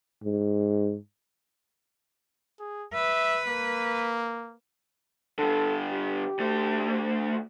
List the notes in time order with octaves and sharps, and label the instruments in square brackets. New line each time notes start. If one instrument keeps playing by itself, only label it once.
[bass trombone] G#2
[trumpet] G#4
[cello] B4 [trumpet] E5
[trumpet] A#3
[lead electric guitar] D3 G3 [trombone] A4
[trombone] G4
[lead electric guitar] D2 A3